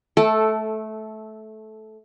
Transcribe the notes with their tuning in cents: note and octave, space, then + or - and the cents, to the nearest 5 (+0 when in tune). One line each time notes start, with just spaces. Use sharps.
A3 -15 A4 +0 G5 -40